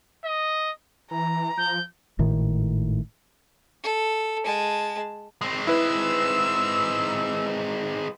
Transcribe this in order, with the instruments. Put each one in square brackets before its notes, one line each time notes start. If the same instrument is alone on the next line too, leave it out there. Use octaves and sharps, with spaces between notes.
[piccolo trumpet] D#5
[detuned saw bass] E3 [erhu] A#5
[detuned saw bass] F3 [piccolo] G6
[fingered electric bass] G#1 A2 D#3
[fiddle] A4
G#3 A5
[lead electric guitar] G#3 C4
[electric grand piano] E4 B4 [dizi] E6